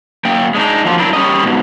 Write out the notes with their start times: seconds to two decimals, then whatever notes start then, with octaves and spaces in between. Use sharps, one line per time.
0.25 F#2 A#3 G5
0.55 G#3 D4 D#4
0.85 F3 F#3 A#3 F4
0.99 F#2 D4 E4 A#4
1.13 G3 C#4 D#5
1.44 G#2 B2